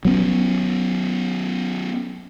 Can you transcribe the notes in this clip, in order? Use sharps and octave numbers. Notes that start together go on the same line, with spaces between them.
F#3 B3 C#4